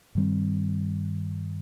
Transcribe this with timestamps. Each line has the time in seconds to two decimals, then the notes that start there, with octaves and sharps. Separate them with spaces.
0.15 G2 D#3 G3 C4